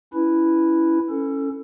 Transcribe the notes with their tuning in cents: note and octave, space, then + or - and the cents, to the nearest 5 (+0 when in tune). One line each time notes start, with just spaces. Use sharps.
C#4 +20 E4 +0 B4 +0
C#4 +0 A4 +15